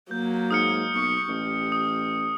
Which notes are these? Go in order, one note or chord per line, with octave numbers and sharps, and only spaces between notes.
F#3 A#3 G6
G#2 D#6 F6 C#7
B1 C#6
A1 G4
D#6